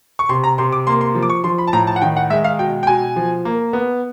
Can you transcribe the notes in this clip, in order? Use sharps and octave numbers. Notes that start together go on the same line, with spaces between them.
C#6
C3 C6
A#5
C3 C6
D6
A#3 C6
C6
F3
D6
C#6
F3 C6
B5
A5
A2 A#5
A5
F#5
D#3 G5
F#5
G#3 E5
F5
B2 G5
G5
B2 G#5
F3
A#3
B3